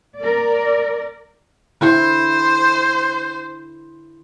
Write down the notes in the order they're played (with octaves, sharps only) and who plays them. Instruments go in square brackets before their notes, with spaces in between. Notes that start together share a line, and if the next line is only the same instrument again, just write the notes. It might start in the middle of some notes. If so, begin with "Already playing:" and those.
[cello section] A#4 D5
[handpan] D3 E4 [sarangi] C5